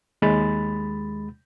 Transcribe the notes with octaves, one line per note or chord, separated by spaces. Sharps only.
D#2 G#3 B5 A6